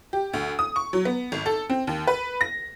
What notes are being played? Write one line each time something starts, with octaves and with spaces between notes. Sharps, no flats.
G4
D2
D#6
C#6
F#3
B3
G#1
A4
C4
D#2
B4
A#6